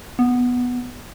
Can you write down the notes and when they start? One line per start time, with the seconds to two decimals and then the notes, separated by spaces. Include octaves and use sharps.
0.19 B3